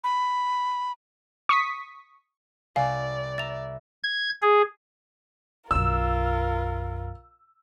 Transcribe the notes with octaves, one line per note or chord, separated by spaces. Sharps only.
B5
C#6 D#6 B6
C2 D5 F5 G#5
E5 A#5 A6 F7
G#6
G#4
B1 F#2 F4 A#4 E6